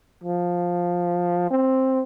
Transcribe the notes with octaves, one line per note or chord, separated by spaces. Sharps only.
F3
C4